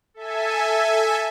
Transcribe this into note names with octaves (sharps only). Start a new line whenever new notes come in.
A4 E5 G#5